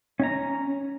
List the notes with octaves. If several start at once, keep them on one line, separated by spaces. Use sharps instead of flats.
C#4 A#5